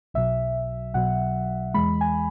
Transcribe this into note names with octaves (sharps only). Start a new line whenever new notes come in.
B1 B2 F#3 E5
B1 B2 F#3 F#5
E2 E3 G#3 B5
G#5